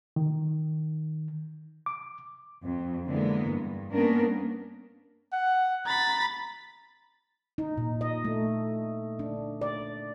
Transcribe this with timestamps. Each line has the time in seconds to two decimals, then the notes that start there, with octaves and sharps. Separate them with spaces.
0.16 D#3
1.86 D6
2.63 F2
3.07 D3 E3 G#3 A#3 B3
3.49 G2
3.91 A#3 B3 C#4 D4 A#4
5.33 F#5
5.86 A#5 B5 A6
7.58 D#4
7.78 A#2
8.01 D#5
8.25 A3
9.19 D4
9.62 D5